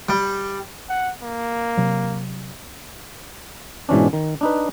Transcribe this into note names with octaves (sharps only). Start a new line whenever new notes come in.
G3
F#5
A#3
C3 F#3
G#2 B2 E3 C#4 D4
D#3
D4 D#4 B4